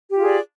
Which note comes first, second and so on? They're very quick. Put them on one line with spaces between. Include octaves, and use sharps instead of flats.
G4 F4 G#4 D5